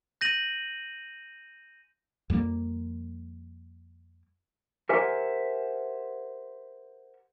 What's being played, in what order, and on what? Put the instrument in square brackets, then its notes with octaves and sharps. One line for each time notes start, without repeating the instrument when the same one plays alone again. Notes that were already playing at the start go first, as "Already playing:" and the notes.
[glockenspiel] G6 A#6 D#7 F#7
[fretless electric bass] F2 G3 A#3
[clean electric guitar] G4 A#4 C5 E5 F#5 G#5